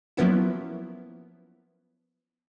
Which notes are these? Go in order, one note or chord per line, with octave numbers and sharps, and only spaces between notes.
F3 F#3 A#3 B3 C#4 E4